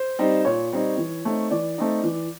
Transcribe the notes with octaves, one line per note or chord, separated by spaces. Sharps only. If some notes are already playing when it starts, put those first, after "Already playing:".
Already playing: C5
G3 C4 D#4
A#2 C#5
G3 C4 D#4
E3
A3 C4 D#4
E3 D5
A3 C4 D#4
E3